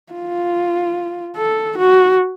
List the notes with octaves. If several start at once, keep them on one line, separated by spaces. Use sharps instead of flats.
F4
A4
F#4